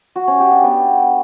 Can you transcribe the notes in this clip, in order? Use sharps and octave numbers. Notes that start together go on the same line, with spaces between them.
F#4
C#4
G4
D4
B3